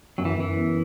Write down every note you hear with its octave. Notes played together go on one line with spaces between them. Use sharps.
F#2 F#3
E3
F#2 E3
B3